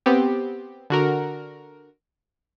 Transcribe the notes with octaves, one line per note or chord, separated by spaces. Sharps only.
B3 C4 G4
D3 F#4 A#4